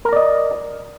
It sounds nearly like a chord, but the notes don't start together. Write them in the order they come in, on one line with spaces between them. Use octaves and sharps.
A#4 A#5 D5 D#5